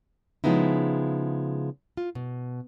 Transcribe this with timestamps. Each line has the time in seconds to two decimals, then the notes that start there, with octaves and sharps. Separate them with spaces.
0.44 C#3 F3 G#3 B3 D#4 E4
1.97 F4
2.15 B2